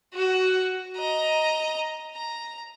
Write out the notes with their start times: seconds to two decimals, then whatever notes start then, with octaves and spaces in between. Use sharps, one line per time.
0.14 F#4
0.97 D#5 A#5
2.15 A#5